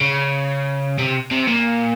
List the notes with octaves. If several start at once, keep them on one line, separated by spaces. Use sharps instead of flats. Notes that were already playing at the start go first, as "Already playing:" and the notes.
C#3
C3
C3
A#2